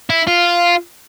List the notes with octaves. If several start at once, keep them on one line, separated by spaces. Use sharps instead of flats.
E4
F4